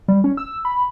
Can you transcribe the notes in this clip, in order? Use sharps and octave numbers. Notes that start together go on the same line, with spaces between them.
G3
C#4
E6
B5